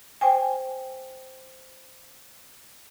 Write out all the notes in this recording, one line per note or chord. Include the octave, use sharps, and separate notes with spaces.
C5 G5 G#5